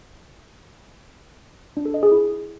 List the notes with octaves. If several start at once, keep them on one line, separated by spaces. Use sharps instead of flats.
D4
A4
D#5
G#4
E4